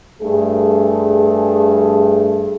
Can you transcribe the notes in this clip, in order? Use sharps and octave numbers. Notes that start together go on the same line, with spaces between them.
G2 A3 G#4